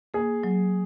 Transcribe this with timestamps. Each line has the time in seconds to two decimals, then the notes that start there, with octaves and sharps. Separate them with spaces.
0.14 A#3 G#4
0.43 F#3